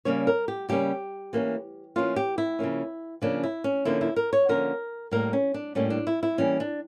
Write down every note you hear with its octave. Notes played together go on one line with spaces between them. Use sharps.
C#3 G3 A#3 C#4 C#5
A#4
G4
C#3 G3 A#3 C#4 G4
E3 A#3 C#4
E3 A#3 C#4 F4
G4
E4
C#3 F3 A#3 C#4
C#3 F3 A#3 C#4 D4
E4
C#4
D3 F3 A#3 C#4 E4
E4
A#4
C#5
D3 F3 A#3 C#4 A#4
A2 G3 A#3 A#4
C#4
D4
A2 G3 A#3 C#4
D4
E4
E4
E3 G3 A#3 C#4
D4